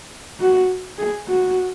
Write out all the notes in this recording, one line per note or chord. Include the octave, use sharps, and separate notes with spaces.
F#4
G#4
F#4